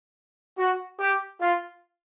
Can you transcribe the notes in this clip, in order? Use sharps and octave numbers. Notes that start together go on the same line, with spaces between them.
F#4
G4
F4